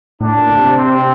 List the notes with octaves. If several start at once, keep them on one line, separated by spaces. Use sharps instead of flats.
A2 D4
A#2
D3
C3
C4